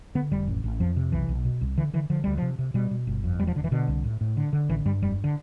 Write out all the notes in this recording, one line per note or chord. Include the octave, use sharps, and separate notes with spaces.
D3 B3
F1 G3
A1
A1
F2 F3
C3
B1 E3
B1
B2
C2
D3 E3
D3 E3
D3 F3
D2 G3
C3 F3
C3
B2 G3
B2
G1
F2
E1 G3
F3
D3
E3
B2 D3
C2
A2
A2
D3
D3
A1 E3
G2 G3
F1 G3
D3